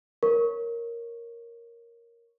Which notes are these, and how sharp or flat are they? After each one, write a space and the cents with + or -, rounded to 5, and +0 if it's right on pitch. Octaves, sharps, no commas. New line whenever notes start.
A#4 +0 C#5 +0 C#6 +0